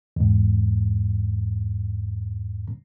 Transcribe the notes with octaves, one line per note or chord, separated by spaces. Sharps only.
E2 G#2